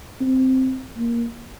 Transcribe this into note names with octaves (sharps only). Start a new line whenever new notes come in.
C4
A#3